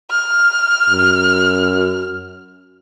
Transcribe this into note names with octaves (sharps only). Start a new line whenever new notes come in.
F6
F#2